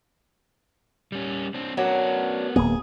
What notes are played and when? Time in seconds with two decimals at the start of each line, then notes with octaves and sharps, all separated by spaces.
1.12 G3 C#4
1.54 C4 D4
1.77 F#3 B3 C#4 D4 A#4
2.56 D1 A#3 B3 G#4